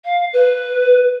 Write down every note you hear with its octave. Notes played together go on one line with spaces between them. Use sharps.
F5
B4